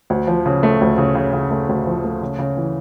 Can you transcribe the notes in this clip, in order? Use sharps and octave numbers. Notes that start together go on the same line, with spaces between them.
D2
F3
C#3
A3
D2
C#3
C#3
C#3
A3
D2
F3
A3
C#3
C#3
E3